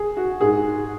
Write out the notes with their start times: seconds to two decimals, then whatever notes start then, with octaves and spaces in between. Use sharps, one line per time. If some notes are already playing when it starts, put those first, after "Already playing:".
Already playing: G#4
0.17 F#4
0.41 G#2 G#4